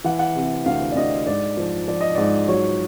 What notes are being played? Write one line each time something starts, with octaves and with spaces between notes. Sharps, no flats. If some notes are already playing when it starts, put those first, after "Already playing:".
E3 F#5
F#5
C3
D2 F5
D5
D2 D#5
G#2 D5
F3
F3 D5
D#5
G#2 D5
F#3 C#5